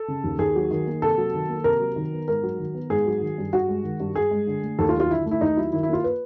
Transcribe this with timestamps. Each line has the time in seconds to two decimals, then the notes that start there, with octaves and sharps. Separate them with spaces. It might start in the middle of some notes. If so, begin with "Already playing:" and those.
Already playing: A4
0.08 C#3
0.24 D#2
0.39 D#2 G#4
0.56 F#3
0.71 D#3
0.87 A#3
1.02 C3 A4
1.18 F#3
1.34 D#3
1.49 A#3
1.64 C3 A#4
1.80 F#3
1.96 D#3
2.12 B3
2.28 G#2 A#4
2.43 F#3
2.59 D#3
2.75 B3
2.90 G#2 G#4
3.06 F#3
3.21 D#3
3.38 G2
3.53 G2 F#4
3.69 G#3
3.84 D#3
4.00 G2
4.16 G2 G#4
4.31 G#3
4.47 D3
4.63 A3
4.79 D#2 A4
4.89 F4
4.94 F#3
5.00 F4
5.10 D3 E4
5.26 A3
5.31 E4
5.41 D#2 D#4
5.57 F#3 E4
5.72 D#3 E4
5.83 E4
5.88 A#3 F4
6.04 B4